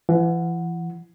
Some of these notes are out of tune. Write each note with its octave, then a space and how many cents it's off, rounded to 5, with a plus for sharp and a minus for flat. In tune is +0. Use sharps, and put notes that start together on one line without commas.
E3 +35 F#5 -5